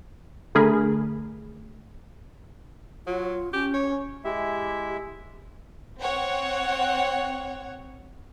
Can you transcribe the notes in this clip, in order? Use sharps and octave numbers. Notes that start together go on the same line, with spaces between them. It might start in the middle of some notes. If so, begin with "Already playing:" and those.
D3 A3 G#4 A#4 B5
F#3 F4
C#4 G4
C#5
G#3 E4 G4 E5
C4 C#5 F#5